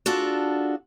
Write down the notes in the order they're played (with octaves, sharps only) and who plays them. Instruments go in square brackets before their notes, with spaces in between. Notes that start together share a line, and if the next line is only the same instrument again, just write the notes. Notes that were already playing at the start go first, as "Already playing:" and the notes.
[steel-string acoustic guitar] D4 F4 F#4 G#4 A4